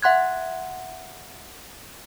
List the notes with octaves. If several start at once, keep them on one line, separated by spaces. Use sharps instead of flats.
E5 F#5 C6 F#6 G#6